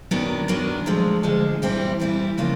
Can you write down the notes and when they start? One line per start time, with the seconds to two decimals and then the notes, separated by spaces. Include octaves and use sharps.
0.11 F#2 D#3 F#3 B3 D4
0.48 F#2 D#3 F#3 B3 D4
0.86 D2 D3 F3 G#3
1.23 D2 D3 F3 G#3
1.62 G2 E3 G3 C4 E4
2.00 G2 E3 G3 C4 E4
2.38 C#3 F3 A#3 D4 F4